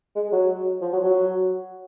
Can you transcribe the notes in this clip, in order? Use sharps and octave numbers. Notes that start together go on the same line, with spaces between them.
G#3
F#3
F3
F#3
F#3